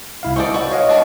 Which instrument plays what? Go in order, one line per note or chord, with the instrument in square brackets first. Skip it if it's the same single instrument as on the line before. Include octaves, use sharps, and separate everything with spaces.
[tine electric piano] C2 E4 F5
[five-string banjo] C4 D#4 D5 [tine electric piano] C#6
[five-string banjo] F#4 B4
[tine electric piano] C#5 D#5 F#5 [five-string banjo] F5
[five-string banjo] B3 D4 F#4